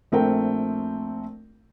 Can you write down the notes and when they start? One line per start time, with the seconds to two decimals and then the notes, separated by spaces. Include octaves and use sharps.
0.12 A#1 A3 C4 A#4 G5